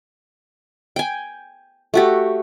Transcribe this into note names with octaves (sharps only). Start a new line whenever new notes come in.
G5 G#5
A3 F#4 G4